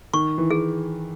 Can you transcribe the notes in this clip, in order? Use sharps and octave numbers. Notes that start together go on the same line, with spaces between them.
D#3 C#6
E3
G#4